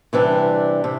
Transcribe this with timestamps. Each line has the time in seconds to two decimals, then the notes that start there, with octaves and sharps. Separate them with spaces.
0.13 C3 E3 G3 D4
0.84 C3